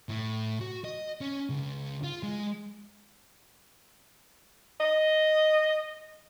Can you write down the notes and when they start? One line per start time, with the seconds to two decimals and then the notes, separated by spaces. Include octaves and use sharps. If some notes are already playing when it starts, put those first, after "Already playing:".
0.09 A2
0.61 F#4
0.84 D#5
1.21 C#4
1.50 C#2
2.04 F4
2.23 G#3
4.80 D#5